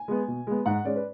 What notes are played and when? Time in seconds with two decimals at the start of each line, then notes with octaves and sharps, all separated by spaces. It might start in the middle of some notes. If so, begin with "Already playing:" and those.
Already playing: G#5
0.08 G#3 B3
0.28 B2
0.47 G#3 B3
0.66 G#2 F#5
0.85 G#3 C#4 D5
0.96 B4